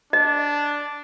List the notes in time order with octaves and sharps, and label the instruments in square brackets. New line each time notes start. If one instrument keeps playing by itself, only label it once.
[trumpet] D4 [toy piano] D#5